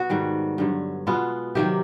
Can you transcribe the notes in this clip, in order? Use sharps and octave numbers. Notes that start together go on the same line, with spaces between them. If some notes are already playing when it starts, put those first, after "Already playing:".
Already playing: B2 B3 F#4
G#2 D#3 G3
G2 D3 F#3
B2 G#3 B3 F4
C3 D#3 F#3 A#3 G4